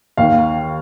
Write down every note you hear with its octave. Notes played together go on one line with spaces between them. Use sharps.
D#2 D#3 F5